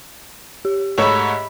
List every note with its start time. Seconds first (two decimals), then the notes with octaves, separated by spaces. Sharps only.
0.65 G4
0.98 G#2 A3 C#5 E5 B5